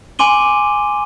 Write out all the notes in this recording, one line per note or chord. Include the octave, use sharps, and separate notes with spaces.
G#5 C6 D6 D#7 G7